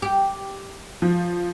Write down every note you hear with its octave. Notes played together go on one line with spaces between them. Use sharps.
G4
F3